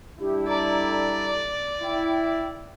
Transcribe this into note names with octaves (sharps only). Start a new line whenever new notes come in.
G3 D4 E4 G4
A4 D5 A#5
E4 G5